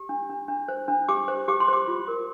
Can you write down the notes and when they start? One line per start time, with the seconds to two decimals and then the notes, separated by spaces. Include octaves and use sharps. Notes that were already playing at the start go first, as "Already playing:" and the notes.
Already playing: G4
0.09 D4
0.30 D4
0.48 D4
0.68 C5
0.88 D4
1.09 G4 D6
1.28 C5
1.48 G4 D6
1.60 C6
1.68 C5 D6
1.88 F4
2.08 A#4